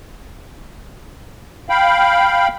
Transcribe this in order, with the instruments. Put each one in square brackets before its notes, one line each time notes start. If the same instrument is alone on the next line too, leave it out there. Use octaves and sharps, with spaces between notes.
[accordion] F5 G5 B5